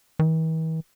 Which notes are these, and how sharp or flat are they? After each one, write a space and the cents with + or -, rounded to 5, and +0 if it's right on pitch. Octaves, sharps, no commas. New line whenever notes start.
E3 -45